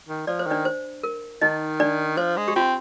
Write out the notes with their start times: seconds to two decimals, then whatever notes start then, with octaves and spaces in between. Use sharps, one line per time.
0.08 D#3
0.27 F3 D5
0.39 C5
0.47 D#3 D4 D5
0.65 C5
1.03 A#4
1.41 D#3 D#4 D#5
1.80 D4 D5
2.17 F3 C5
2.37 G#3
2.48 G4
2.56 C4 F4